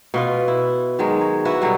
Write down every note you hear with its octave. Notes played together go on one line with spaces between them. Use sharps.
B2 F4 B4
E4
D#3 F#3 G#3
C#5
E4 F#4 B4 E5
B2 D3 F#3 G3